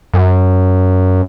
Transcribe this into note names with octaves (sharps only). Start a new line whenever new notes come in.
F#2